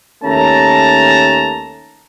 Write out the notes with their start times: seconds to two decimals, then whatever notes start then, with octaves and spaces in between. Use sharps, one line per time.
0.24 D#2 A3 C#4 A5 A#5